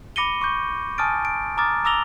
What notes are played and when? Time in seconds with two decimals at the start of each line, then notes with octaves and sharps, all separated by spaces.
0.16 B5 D6 A#6 C#7 D#7 G7
0.41 C#6 D6 G6
0.98 G#5 A5 D#6 F6 A6 D7
1.25 D7
1.58 A#5 D6 D#6 F6 A6
1.85 A#5 D6 E6 A#6 F7 G7